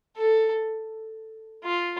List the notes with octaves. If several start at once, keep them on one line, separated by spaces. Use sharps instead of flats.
A4
F4